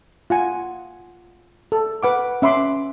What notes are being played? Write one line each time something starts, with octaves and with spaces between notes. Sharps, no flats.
F4 F#5 G#5
A4
B4 F#5 D6
C#4 E5 B5 C6 D6